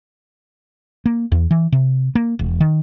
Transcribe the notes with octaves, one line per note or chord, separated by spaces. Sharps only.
A#3
E2
E3
C3
A#3
E1
D#3